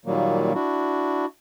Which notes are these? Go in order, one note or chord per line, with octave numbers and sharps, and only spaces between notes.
A#2 D#3 F#3 G3 A#3
D4 E4 F#4